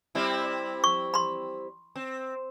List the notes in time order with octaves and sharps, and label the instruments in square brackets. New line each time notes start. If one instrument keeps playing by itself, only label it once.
[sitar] G3 C4 E4
[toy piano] C#6
B5 C6
[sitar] C4